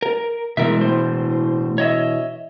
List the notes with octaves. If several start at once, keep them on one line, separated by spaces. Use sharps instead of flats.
A#4
B2 E3 G#3 A#4 E5
A2 C5
C#5 D#5 E5